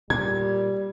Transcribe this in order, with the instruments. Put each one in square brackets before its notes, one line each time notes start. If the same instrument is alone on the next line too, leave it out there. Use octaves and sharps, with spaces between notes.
[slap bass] A#2 [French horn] G3 [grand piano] G#6